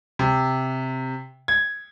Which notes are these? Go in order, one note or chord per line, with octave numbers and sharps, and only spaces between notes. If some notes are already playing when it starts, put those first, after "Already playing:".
C3
G#6